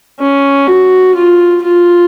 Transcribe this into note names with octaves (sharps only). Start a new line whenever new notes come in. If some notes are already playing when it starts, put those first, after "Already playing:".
C#4
F#4
F4
F4